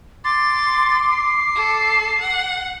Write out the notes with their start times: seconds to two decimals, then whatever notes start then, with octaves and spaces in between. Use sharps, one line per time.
0.25 C6 D6 A6
1.10 C7
1.55 A4
2.21 F#5